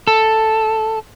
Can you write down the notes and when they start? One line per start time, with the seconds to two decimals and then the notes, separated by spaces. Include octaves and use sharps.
0.07 A4